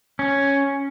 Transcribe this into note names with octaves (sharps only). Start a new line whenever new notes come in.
C#4